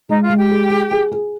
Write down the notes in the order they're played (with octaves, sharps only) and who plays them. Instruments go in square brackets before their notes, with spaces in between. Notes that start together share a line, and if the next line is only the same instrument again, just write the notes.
[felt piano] G#3 [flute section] D#4
[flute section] F4
[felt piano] G#3
[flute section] G4
[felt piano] G#4
G#4
G#4
G#4